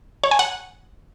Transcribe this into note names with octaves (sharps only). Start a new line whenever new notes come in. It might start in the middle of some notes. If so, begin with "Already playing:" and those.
C#5
G#5
F#5